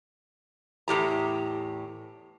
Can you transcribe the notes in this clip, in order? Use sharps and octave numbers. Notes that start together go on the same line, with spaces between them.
E2 A2 G4 A#5